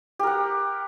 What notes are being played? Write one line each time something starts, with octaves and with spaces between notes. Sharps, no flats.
G4 A#4 F#5